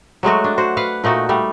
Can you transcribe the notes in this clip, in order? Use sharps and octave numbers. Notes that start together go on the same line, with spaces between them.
F#3 G#3 A3 F#4
D4
F#4 C5
B4 F5 F#5
A#2 A3 D#4 F#4
G3 A3